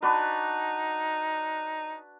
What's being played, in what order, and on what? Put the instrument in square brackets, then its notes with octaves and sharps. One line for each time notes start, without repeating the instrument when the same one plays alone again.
[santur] D4 F#4 B4 [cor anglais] D#4